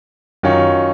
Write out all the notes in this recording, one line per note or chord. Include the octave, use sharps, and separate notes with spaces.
F#2 D#3 F#3 C#4 F4